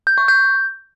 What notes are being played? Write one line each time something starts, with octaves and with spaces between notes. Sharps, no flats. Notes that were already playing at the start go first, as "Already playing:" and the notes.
G6
C#6
G6